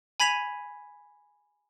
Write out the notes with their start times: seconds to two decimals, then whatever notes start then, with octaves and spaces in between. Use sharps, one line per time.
0.20 G#5 B5 G#6 B6 D#7 F7